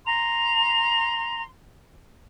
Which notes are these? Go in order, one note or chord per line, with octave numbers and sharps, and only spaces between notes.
A#5 C6 F7